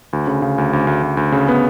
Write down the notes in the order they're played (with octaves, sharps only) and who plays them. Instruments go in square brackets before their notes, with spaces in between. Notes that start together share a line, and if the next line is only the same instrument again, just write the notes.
[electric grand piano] D2
C#3
C#3
D2
D2
D2
D2
D2
C#3
B3